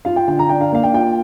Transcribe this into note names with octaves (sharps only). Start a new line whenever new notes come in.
F4 F5
G5
D3 G5
A#5
D4 G5
F5
A#3 F5
G5
F4 G5